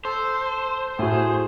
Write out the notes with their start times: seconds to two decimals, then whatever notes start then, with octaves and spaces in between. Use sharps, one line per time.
0.05 A4 C5
0.99 A2 F#4 G#4